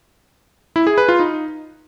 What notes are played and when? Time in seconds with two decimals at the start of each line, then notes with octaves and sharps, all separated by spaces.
0.76 E4
0.87 G#4
0.98 B4
1.08 F4
1.19 D#4